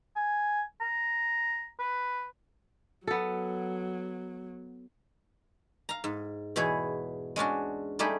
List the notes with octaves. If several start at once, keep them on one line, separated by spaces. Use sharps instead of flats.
G#5
A#5
B4
F#3 B3 A4
F5 A#5
G#2
E2 B2 E4 G#4 C#5 G#5
G#3 C#4 D4 F#4
G3 A3 D#4 G4 G#4